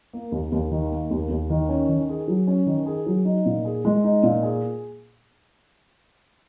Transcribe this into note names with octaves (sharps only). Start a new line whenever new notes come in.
A#3
D#2
D#2
D#3
A#3
D#2
D#2
D#3
C#4
D#3
G#4
F#3
C#4
D#3
G#4
F#3
D#4
A#2
G#4
G#3
D#4
A#2
G#4